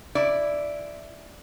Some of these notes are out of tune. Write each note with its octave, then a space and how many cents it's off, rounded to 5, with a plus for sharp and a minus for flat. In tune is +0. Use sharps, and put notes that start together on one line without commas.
E4 +0 D5 +0